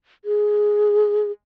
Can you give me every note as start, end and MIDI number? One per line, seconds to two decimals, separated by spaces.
0.25 1.31 68